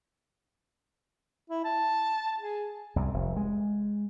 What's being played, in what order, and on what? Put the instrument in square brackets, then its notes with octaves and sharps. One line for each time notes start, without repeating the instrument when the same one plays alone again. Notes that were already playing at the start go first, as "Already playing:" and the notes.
[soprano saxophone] E4
A5
G#4
[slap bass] C2 F#2
F1
G#3